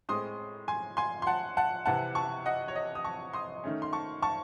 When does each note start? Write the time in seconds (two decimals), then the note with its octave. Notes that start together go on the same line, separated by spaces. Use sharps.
0.09 A2 G#3 C4 C6 D#6
0.68 G#5 C6
0.97 G#5 C6
1.22 C6
1.27 F#5 A5
1.57 F#5 A5
1.86 C3 E3 C4 F#5 A5
2.15 A5 C#6
2.46 D#5 F#5
2.68 C#5
2.75 D#5
2.95 D#6
3.04 A5 C#6
3.33 C6 D#6
3.64 D#3 A3 C#4
3.82 C6
3.93 A5 C#6
4.22 A5 C#6